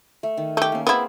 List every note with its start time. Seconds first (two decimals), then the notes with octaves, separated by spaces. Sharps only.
0.23 A3
0.37 D#3
0.57 A3 G4
0.72 A#3 C#4
0.87 B3 C4 E4 G#4